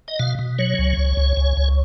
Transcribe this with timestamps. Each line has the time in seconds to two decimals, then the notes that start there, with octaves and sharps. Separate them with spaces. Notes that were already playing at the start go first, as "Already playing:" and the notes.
0.08 D#5
0.19 B2 F5
0.39 B2
0.59 F#3 C#5
0.78 C#2
0.97 C#2
1.17 C#2
1.37 C#2
1.57 C#2